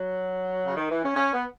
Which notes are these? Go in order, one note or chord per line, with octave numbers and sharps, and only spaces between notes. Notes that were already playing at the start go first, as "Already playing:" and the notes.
Already playing: F#3
C#3
D#3
E3
C#4
C#4
B3